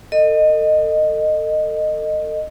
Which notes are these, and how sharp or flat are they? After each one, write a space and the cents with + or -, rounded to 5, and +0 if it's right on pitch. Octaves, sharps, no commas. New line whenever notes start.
A4 +35 D#5 -15